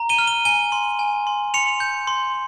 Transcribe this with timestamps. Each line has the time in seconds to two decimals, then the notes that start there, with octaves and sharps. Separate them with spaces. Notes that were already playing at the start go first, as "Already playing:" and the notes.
Already playing: A#5
0.09 D#7 G7
0.18 F6
0.27 D#7 G7
0.45 G#5 D#7 G7
0.72 C6
0.99 G#5
1.27 C6
1.54 C6 C#7 F7
1.80 G6
2.07 C6